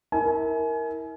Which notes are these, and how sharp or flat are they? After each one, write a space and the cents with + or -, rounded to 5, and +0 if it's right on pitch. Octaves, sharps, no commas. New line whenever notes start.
E4 -30 A#4 +0 G#5 +30